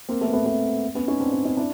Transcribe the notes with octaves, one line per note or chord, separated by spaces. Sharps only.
A#3 C4
A3 B3
C4
A3 B3
A3 B3
B3 C#4
C#4 D#4
C4 D4
C4 D4
C#4 D#4
D4 E4